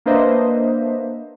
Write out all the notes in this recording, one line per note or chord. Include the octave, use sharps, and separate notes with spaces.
A#3 D4 B4 C5 D#5 E5